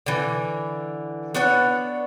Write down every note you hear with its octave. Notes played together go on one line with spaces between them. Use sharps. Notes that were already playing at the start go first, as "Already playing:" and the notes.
D3 E3
B3 D4 C#5 F#5